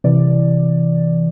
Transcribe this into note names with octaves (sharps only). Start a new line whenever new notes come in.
C3 E3 D5